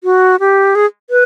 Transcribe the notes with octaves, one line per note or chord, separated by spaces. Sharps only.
F#4
G4
G#4
B4